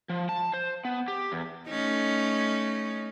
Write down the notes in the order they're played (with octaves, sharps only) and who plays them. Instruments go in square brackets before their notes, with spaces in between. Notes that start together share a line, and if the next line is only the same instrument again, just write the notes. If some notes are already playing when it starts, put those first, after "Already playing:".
[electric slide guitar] F3
A5
C5
B3
G4
E2
[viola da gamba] A3 C#4 D#4